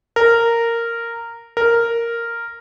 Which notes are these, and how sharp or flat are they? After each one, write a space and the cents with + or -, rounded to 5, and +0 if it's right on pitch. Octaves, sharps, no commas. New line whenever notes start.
A#4 -10
A#4 -5